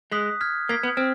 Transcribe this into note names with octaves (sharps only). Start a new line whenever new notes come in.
G#3 D#6 F#6 B6
F6 G#6 B6
A#3 F6 G#6 B6
B3
C4 F6